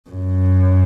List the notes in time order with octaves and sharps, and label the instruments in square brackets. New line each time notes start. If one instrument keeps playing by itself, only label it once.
[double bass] F#2